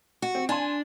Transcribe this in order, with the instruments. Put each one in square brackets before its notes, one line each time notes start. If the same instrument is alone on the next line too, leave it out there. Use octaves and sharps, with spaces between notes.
[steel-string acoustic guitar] F#4
[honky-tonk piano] C4
[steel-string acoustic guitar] D4 [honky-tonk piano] G#5 A5 C6